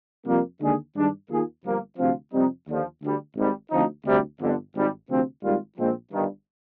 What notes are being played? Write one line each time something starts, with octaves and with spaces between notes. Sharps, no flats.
F2 C3 G3 A#3
D#2 D3 G#3 D4 G#4
G2 D#3 G#3 D4
D#2 D#3 A#3 F4 G#4
G1 G2 F3 A#3
D2 C3 F3 C4 F4
F2 C3 G3 C4 D#4
D#2 D3 F3
D2 D3 G3
G#1 G#2 G3
D2 D3 F3 C4 D#4
D2 C3 G3
G1 F2 D3
G#1 G#2 G3
D2 C3 F3 C4
G#1 G#2 G3 A#3 F4
A#1 A#2 F3 G#3 C4
G1 G2 D#3